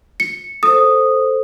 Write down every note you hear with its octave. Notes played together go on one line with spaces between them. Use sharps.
C#7
A4 C5 D#6